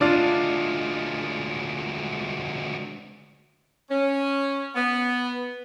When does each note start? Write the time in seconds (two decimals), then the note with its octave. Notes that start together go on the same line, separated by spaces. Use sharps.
0.01 D2 G#3 D4 F4
3.91 C#4
4.75 B3